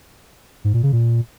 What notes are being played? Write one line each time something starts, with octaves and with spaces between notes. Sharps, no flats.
G#2
A#2
C#3
A#2